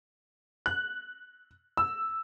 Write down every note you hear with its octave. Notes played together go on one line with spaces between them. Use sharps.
F#6
E6